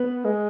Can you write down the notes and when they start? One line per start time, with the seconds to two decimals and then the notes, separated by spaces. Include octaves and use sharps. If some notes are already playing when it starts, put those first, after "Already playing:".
Already playing: B3
0.25 G#3